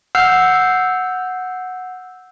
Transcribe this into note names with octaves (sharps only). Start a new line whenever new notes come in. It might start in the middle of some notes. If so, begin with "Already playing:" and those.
F#5 E6 F6 G6 C7